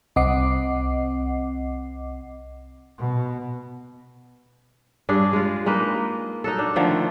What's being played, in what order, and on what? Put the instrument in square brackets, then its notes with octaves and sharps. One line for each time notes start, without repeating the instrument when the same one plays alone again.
[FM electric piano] C2 C4 D#5 F#5 D6 C7
[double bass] B2
[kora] G2 D4 G#4
G#3 F4
G#3 A#3 D#4 B4
D#4 F#4 A4
D4
D3 D#3 F3 A3